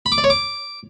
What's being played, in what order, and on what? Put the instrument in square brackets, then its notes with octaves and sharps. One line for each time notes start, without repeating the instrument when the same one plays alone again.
[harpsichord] B5
D6
D5
C#5
D6